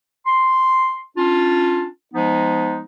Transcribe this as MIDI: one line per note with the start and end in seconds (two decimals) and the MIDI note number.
0.26 0.99 84
1.17 1.86 61
1.17 1.86 62
1.17 1.86 65
2.14 2.82 53
2.14 2.82 56
2.14 2.82 59
2.14 2.82 63